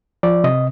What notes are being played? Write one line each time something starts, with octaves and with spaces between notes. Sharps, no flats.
F3 D5
C3 D#5